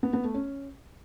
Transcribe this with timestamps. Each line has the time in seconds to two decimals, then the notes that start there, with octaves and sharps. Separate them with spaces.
0.03 B3
0.13 B3
0.24 A3
0.34 C#4